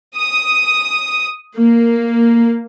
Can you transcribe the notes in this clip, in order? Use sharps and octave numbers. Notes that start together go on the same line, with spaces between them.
D#6
A#3